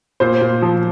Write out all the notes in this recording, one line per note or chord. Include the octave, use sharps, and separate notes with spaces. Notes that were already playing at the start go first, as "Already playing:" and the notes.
A#2 C5
A#2
F3